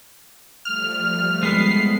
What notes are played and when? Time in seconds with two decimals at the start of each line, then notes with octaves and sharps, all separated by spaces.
0.65 F3 G3 A3 F6
1.43 G#3 B3 C7